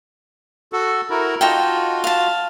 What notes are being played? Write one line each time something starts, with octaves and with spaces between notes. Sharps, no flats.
F#4 A4
E4 F#4 A#4
D#4 F4 F#4 A4 G5
F5 A5